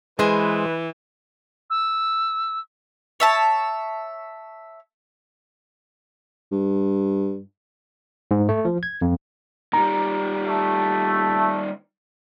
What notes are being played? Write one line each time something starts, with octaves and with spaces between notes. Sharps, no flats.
E3 G#3 G#4 B4 C5
E6
C#5 E5 A5
G2
G#2
A3
F3
G#6
F2
D#3 G3 A#5
A3